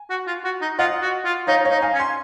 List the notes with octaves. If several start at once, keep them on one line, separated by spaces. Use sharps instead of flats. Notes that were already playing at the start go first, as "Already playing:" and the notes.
Already playing: G#5
F#4
F4
F#4
D#4
F4 D#5 F#5
F#4
F4
D#4 C#5 F5
C#5 F5
D#4
F5 G#5
C#4
G#5 C6